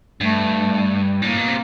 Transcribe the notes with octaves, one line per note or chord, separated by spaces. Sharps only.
G2 A3
A2 A#3
B2
C3